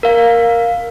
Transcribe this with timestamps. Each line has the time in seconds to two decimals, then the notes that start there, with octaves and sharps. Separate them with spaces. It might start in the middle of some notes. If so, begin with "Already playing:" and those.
0.03 A#4 F5